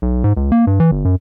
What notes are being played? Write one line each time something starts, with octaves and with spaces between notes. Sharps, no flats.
B1
G#2
C#2
A#3
G2
E3
G1
F#2